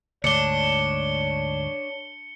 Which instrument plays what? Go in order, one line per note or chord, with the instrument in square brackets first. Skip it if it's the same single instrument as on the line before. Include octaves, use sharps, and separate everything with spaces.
[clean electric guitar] D2 G#2 [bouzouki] D4 [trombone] C#5 [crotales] C#7 G7